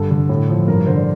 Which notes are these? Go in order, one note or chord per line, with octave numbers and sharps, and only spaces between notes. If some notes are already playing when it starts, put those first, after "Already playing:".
Already playing: G2 D3 A4
D3
A2
F3
G2 A#4
D3 C5
D5